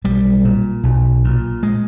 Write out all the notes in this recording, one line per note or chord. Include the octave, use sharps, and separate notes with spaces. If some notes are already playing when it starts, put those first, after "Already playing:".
B1 G3
A#2
B1
A#2
G#3